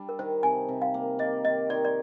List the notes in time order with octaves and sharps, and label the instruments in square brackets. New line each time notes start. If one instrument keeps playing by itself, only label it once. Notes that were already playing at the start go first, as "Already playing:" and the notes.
Already playing: [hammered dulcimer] G3 D4
[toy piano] A#4
[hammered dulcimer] D#3 [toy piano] C5
[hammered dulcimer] C3 [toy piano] G#5
[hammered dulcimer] C3
[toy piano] F5
[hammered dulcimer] A#3
[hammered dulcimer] A#3 [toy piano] D#5
[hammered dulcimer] D#3 [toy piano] D#5
[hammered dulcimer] D#3 [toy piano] D5
[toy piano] D5